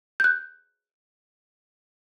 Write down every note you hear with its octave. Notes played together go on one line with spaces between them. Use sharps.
F#6 G6